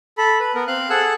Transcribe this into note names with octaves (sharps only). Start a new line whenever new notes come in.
A4 B5
B4
B3 A#4
C4 F5 F#6
G#4 A4 F#5 E6 F#6